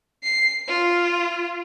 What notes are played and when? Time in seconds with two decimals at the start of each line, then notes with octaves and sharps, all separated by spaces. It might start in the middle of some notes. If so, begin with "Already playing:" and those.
0.23 C7
0.67 F4